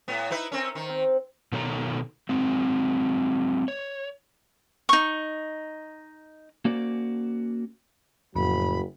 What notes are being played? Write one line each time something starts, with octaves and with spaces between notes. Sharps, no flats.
A2 B3
D#4 E4 B4
C4 C#4 A#4
D#3 C5
C4
B2 D#3 A4 C#5 A5 A#5
F#3 G#3 C4
C#5
D#4 C#6
A#3 C#4 F#4 C5 D5
F#1 F2 A2 F#3 B5